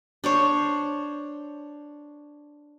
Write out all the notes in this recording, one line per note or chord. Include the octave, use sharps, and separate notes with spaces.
D4 C5 C#5